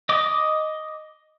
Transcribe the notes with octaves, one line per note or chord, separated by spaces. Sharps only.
D#5 D6